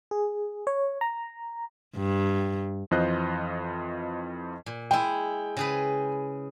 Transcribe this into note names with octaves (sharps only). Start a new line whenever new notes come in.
G#4
C#5
A#5
G2
F2 E3 F4 C5 D#5 F#6
A#2
G#3 E4 G5
C#3 G#4 B4